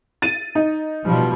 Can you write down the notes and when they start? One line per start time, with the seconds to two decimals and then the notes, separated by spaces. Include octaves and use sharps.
0.22 A6 D#7
0.55 D#4
1.05 B2 F3 G3